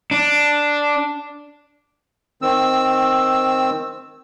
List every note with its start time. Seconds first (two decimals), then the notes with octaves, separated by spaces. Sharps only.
0.11 D4
2.42 D#3 C4 E6